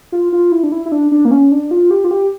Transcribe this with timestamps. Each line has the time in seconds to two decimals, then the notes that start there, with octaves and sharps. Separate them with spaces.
0.12 F4
0.33 F4
0.52 E4
0.63 D4
0.72 E4
0.86 E4
0.92 D4
1.12 D4
1.25 A#3
1.31 C#4
1.52 D4
1.71 F4
1.91 G4
2.04 F4
2.11 G4